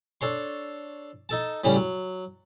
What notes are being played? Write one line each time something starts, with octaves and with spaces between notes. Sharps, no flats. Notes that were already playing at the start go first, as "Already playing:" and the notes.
D4 A4 C#5 C6
D#4 A4 A5
A2 C#3 G3 C#4
F#3